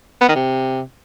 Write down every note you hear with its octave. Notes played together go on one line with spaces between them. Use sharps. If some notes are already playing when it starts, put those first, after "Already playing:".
B3
D#3
C3